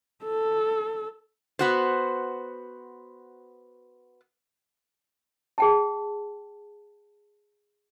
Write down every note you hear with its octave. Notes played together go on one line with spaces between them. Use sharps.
A4
B3 F#4 C5
G#4 G5 A5